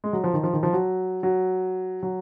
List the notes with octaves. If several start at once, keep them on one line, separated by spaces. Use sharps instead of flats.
G#3
F#3
F3
D#3
F3
D#3
F3
F#3
F#3
F#3